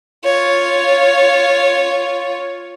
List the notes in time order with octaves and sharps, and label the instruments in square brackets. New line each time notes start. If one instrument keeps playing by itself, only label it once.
[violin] F4 C#5